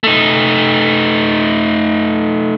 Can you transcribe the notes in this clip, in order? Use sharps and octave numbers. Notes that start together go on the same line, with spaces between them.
A3 D#4